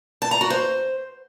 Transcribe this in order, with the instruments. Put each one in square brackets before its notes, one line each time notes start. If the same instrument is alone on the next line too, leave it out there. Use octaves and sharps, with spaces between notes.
[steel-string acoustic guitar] A5
A#5
F#4
C5